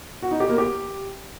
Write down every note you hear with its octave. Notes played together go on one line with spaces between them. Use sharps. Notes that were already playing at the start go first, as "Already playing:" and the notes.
F#4
D#4
G4
A#3
G4